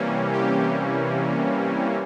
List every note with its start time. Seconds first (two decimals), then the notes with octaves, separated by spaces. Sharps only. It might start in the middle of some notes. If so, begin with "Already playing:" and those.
Already playing: C3 E3 G3 A#3 C#4
0.32 G4